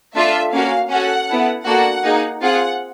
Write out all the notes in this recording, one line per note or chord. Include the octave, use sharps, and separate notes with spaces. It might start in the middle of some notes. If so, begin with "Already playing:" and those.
A3 D4 F4 A4 E5
A#3 C#4 F#4 F5
C#4 F#4 A4 F#5
B3 E4 A4
A#3 D4 F#4 A4 F#5
A#3 D#4 G#4
C4 F4 G#4 F#5